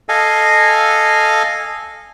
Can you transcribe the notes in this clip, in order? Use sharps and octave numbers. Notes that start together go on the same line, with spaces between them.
A4 D#5 F5 G#5